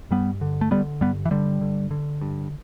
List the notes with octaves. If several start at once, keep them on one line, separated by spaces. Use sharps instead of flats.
G2 G3 B3
D3
A3
D3 G3 B3
G2 G3 B3
E3
G2 D3 G3
D3
D3
G2